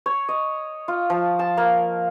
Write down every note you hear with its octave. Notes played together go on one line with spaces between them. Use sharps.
C#5
D#5
F4
F3
A5
A#3